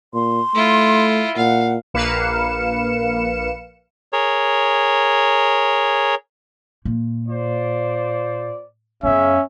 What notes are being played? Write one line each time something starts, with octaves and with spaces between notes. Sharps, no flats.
A#2 C6
A3 E4 F4
A#2 F5 F#5
A#1 A#3 B4 F5 C#7 E7
G#4 A#4 C#5
A#2
F4 C5 D5
F#2 C#3 B3 C#4 E5